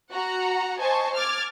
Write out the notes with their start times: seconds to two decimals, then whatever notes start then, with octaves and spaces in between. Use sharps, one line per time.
0.11 F#4 F#5 A#5
0.80 C5 D#5 G#5 A5 C#6
1.17 D6 F6 G#6 A6